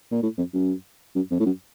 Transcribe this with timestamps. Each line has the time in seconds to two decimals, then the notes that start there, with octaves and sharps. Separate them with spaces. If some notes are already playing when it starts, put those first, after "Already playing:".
0.11 A#2
0.23 A2
0.38 F2
0.54 F#2
1.16 F#2
1.31 F2
1.40 A2
1.46 F#2